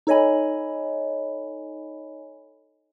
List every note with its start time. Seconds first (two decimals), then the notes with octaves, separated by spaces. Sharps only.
0.07 D#4 A4 C#5 D#5 G#5 B5